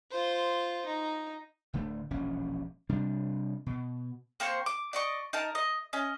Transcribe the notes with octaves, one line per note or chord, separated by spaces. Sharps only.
F4 C5
D#4
D1 D3 A3
E1 A#1 C#4
C3 G3 D4
B2
A#3 C4 C5 C#6
D6
D5 D#5 C#6
D#4 A#4 A5
D#5
C#4 D#5